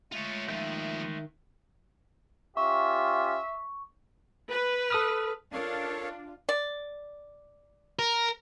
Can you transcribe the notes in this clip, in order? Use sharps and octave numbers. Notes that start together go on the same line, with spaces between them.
G#3 A3 F4 C#5
D#2 D#3 F3 E5 G6
C#4 F4 G4 E5 C#6
B4
A4 D#6 F6
D4 F4 A4 A#4 C#5 F5
D5
A#4